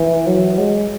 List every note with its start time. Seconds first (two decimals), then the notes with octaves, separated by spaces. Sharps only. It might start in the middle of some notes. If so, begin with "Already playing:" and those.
Already playing: E3
0.27 F#3
0.58 G#3